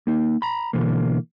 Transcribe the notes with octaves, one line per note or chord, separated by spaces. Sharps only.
A#3 D#4
A#5 B5
B2 D3 E3 A#3